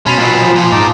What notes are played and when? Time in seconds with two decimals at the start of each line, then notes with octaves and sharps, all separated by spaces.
0.06 B2 C#4 A5 B5 C6
0.18 A#2 F#3
0.41 F3
0.56 A#2
0.72 G#2 D#4 A5 D6